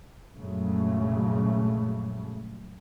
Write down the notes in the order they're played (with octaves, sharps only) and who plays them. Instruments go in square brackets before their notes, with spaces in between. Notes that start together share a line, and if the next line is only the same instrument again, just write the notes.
[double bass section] A#1 F#2 C#3 G#3 A3